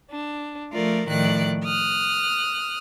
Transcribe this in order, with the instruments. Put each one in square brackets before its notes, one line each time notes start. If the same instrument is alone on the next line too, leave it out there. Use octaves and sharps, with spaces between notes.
[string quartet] D4
F3 A3 F4 A#4 D5
A2 D#3 F3 D5 F#6
D#6 F6 F#6